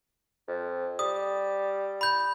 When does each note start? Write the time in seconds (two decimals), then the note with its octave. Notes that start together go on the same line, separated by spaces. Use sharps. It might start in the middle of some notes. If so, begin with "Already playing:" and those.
0.48 F2
0.99 G3 D#6
2.01 B5 G6